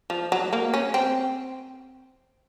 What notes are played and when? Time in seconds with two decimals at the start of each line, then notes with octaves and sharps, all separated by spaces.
0.10 F3
0.32 F#3
0.53 A#3
0.74 C#4
0.94 C4